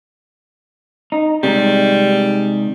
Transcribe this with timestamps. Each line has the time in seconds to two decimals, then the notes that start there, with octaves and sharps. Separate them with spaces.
1.12 D#4
1.43 C3 D#3 G3 G#3